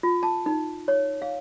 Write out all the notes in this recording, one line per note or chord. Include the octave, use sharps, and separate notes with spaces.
F4
A5
D#4
C#5
F5